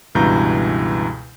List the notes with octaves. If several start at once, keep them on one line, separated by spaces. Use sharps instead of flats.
C#2 G2 B2 E3 A#5 G6